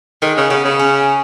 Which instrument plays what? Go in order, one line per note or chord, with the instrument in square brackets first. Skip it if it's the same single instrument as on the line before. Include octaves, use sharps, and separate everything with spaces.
[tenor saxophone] D#3 [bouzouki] G#3
[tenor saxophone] C#3
[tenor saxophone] C#3 [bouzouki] B3
[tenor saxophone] C#3
[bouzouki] C#4